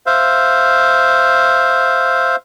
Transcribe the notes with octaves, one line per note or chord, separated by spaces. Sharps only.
C5 E5 F5